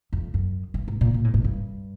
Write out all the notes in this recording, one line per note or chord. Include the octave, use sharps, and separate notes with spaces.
F2
F#2
G2
G#2
A#2
A#2
A2
G#2
G2